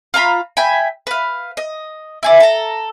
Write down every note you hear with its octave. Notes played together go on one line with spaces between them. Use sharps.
F4 F5 A#5 B5
E5 G5 G#5 B5
B4 F5
D#5
E4 G#4 D5
A4 A#5